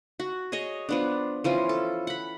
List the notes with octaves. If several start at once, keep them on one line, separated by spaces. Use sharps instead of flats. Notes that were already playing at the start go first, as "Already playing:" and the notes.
F#4
G#4 C#5 D#5
F3 B3 D4
E3 F3 C#4 F4
A4
F#5 B5